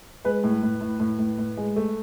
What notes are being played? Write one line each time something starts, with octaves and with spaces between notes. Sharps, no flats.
G#3 B4
A2
A2
A2
A2
A2
A2
G#3
A3